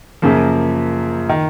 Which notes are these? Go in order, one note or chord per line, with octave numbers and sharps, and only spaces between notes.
F#2 C#3 F3 A#3
D#3